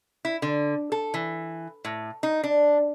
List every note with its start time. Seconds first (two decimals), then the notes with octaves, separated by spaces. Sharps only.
0.25 E4
0.42 D3
0.92 A4
1.14 E3
1.85 A2
2.23 D#4
2.43 D4